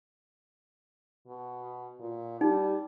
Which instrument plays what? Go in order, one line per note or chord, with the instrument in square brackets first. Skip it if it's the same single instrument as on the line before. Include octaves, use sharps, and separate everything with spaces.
[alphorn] B2
A#2
[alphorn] G3 [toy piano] D#4